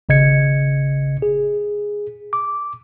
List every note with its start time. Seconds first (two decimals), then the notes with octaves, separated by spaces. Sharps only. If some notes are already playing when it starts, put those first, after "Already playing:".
0.09 G#1 C#3 D#5 G#6 C#7
1.22 G#4
2.33 D6